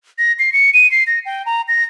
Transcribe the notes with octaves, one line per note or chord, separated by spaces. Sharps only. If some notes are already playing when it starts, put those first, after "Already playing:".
A#6
C7
C#7
D#7
C7
A#6
G5
A#5
A#6